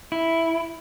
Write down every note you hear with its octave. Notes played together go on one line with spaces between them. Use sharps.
E4